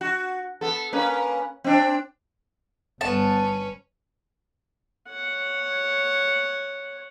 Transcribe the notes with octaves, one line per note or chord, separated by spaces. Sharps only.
F#4
B3 A4
A#3 C#4 B4
C4 D4
G1 G3 B3 C#4 B4 A5
C#5 F#5